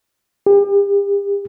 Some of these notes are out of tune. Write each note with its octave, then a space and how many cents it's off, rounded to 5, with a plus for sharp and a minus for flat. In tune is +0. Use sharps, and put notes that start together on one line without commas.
G4 +40